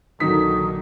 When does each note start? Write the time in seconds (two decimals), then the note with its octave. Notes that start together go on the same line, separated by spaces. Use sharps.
0.20 A#1 D3 D#3 F#3 D#4 D#6 B6